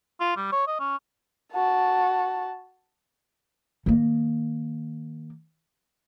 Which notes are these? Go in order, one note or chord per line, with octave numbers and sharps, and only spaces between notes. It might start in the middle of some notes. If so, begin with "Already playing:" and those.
F4
G3
C#5
D#5
C#4
F#4 A5
D#3 A#3